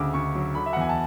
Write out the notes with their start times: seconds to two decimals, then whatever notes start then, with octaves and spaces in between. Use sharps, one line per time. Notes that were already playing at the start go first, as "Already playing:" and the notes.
Already playing: D2 C#3 D6 E6
0.13 D2 C#6
0.35 F#3
0.55 D3 B5
0.66 E5
0.73 F#5
0.77 E2 G#5
0.89 A5